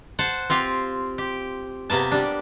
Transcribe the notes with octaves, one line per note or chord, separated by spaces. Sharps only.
C5 F#5 A5
C4 F4 G4 F5
G4
C3 A#3 B3 A5
G3 D4